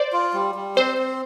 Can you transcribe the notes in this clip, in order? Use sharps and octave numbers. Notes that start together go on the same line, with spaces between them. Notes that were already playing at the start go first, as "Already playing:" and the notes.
Already playing: C5 D5
F4
G3
G3
C4 C5
C4